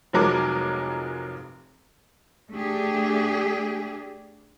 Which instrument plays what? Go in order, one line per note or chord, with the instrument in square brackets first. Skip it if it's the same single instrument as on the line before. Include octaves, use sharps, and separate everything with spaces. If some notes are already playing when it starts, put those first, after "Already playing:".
[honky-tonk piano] F1 F3 F#3 G#3 A#4 D6
[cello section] A3 D4 G4 G#4